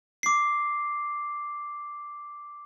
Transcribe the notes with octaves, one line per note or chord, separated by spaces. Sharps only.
D6 C7